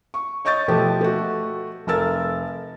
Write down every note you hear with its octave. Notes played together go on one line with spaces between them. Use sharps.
C#6
C#5 D#5 C#6 G6 A6
B2 F3 A3 G4 A4
A3 F#4
F1 A4 A#4 E6 A6